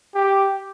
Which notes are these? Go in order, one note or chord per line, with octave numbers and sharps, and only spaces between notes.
G4